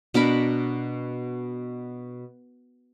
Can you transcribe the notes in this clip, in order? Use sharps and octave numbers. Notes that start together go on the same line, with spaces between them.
B2 D4 A#4 B5